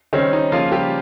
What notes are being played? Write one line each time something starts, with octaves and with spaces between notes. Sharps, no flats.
D#3 G3 C4 C#4
D#4
C#3 F3 A#3 F4
G3 G4